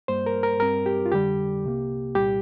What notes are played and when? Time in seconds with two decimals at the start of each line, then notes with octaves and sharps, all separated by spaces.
0.08 G2 G3 A#3 C5
0.26 A#4
0.43 A#4
0.60 G2 G3 C4 A#4
0.86 G4
1.06 F4
1.12 F2 D3 G3 G4
1.64 C2 C3 A#3
2.15 C2 A#2 G3 G4